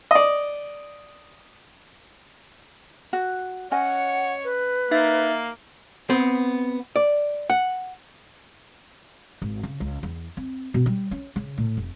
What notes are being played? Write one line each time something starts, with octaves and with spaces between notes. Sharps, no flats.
D5 D#5
F#4
C#4 C#5 D#5 F#5 G#5
B4
A#3 D#4 E5 A6
B3 C4
D5
F#5
G#1
C#3
C#2
E2
C4
B2
G3
C#4
C#3
A2
F1